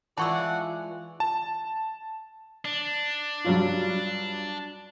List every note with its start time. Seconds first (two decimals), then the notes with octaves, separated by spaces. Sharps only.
0.18 E3 G#3 F4 D5 F#5 A5 C#6 E6
1.20 A5
2.65 D4
3.45 G2 F#3 F4